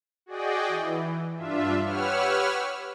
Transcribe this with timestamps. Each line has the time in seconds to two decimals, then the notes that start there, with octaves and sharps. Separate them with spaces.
0.26 F#4 G#4 D5 D#5 G5
0.68 E3
1.36 G2 D4 F4 E5
1.83 G4 B4 C#5 F#5 E6 F6